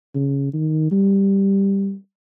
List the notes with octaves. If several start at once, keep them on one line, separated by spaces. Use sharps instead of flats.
C#3
D#3
G3